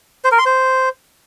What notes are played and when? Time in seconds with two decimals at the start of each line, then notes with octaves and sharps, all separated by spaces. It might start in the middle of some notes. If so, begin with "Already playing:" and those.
0.24 C5
0.32 A#4
0.39 C6
0.46 C5